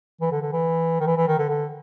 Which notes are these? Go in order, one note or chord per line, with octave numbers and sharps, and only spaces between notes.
E3
D3
D3
E3
D#3
E3
E3
D#3
D3
D3